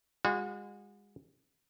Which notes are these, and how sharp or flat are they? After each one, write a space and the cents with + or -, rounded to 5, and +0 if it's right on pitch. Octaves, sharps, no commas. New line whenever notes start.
G#3 -35 F#4 -40